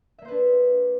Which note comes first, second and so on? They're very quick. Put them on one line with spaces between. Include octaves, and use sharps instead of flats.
E5 A#3 C5 B4 D4